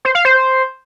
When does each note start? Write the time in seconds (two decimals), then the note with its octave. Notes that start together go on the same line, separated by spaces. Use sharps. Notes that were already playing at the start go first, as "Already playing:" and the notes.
0.05 C5
0.15 F5
0.25 C5